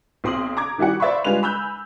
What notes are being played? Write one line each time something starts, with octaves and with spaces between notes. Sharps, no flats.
B1 C4 C6 D#6 F#7
A#5 D6 G#6
D#3 G3 E4 F#4 F#5
C5 D5 E5 F5 B5 C#6
G3 G#3 D4 F4 B4 F7
G#5 B5 E6 F#6 G6